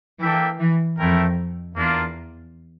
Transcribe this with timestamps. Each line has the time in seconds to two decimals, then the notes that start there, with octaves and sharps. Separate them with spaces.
0.20 E3 A#3 D4 A4 E5 G5
0.59 E3
0.98 F2 A3 E4 A#4 E5 G5
1.75 E2 A#3 D4 F4 A#4